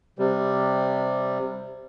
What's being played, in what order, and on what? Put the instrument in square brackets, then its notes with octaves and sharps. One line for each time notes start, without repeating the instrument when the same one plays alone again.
[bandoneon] C3 G3